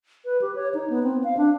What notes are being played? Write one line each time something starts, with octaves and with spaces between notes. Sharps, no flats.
B4
G4
C#5
D#4
B3
C4
F5
D4